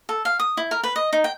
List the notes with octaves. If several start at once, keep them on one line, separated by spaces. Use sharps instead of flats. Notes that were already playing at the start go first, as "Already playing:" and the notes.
A4
F5
D#6
E4
A#4
B4
D#5
D#4
G5